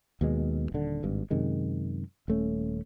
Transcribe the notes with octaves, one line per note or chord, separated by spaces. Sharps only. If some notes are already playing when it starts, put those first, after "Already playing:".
D#2 B2 G#3
D#1 D3
G#1 G2
F#2 C3 D#3 G#3
D#1 A3 C#4